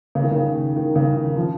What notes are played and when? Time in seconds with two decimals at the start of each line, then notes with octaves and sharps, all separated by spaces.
0.15 C#3
0.24 D#3
0.31 C#3
0.76 D#3
0.96 C#3
1.16 D#3
1.36 F3